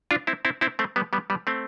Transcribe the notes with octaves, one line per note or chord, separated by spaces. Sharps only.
D4 F4
C4 E4
C4 E4
C4 E4
A3 C4
G3 B3
G3 B3
G3 B3
A3 C4